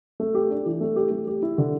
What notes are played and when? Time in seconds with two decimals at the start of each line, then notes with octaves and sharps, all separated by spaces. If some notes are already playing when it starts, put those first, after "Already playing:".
0.20 A3
0.35 G4
0.51 D4
0.66 E3
0.81 A3
0.96 G4
1.11 A3
1.27 G4
1.42 E4
1.58 D3